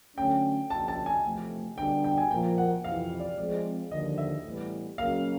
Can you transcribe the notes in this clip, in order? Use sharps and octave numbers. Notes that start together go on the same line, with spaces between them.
D3 F#3 A3 C#4 G5
C#3 F3 A#3 D4 A5
A5
G#5
E2 C3 F3 A3
D3 G3 B3 D4 G5
G5
G#5
A#2 F3 A#3 G5
F#5
F2 C3 E3 F5
D5
F3 G#3 C4 D5
D#2 D3 F3 D#5
E5
A2 E3 G3 B3
C#3 F#3 A#3 F5